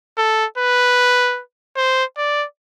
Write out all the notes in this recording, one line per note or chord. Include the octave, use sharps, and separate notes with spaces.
A4
B4
C5
D5